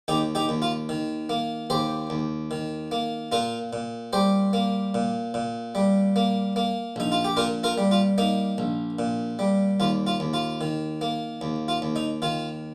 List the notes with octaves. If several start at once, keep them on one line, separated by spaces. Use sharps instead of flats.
D#2 D#4 G4
D#4 G4
D#2
F4
D#3
A#3
D#2 G4 C5
D#2
D#3
A#3
A#2 F4 A#4
A#2
G3 G4 C5
A#3
A#2
A#2
G3
A#3
A#3
A#1 D#4
F4
G4
A#2 F4 A#4
F4 A#4
G3
F4
A#3 D#4
A#1
A#2
G3
D#2 F4
F4
D#2
F4
D#3
A#3
D#2
F4
D#2
D#4
D#3 F4